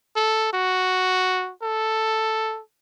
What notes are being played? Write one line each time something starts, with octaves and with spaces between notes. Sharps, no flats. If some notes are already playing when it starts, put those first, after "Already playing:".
A4
F#4
A4